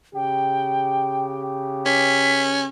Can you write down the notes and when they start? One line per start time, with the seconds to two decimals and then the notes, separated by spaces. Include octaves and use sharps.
0.15 C#3 G4 G5
1.86 C#4 B6